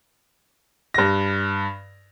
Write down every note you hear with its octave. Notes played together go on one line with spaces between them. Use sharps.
G2 A#6